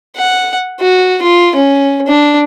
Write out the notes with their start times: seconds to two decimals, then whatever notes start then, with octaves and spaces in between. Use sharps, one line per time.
0.16 F#5
0.80 F#4
1.22 F4
1.56 C#4
2.07 D4